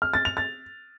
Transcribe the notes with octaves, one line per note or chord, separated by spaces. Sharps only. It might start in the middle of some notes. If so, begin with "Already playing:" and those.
F6
A6
F7
A6